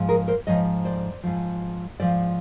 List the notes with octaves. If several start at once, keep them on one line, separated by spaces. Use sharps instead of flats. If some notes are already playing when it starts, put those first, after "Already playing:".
Already playing: G#2 F3
G#4 A#4
A#4 C5
G#2 F3 C#5 D#5
C5 D5
G#2 F3
G#2 F3 C5 D5